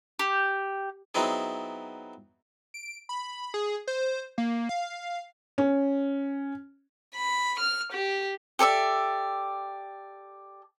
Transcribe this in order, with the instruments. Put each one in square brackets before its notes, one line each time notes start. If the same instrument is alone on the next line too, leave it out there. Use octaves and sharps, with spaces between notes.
[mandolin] G4
[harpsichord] F#3 B3 C4 D#4 E4 G#4
[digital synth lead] D7
B5
G#4
C5
A#3
F5
[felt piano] C#4
[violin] B5
F6
G4
[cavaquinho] G4 A4 D5 E5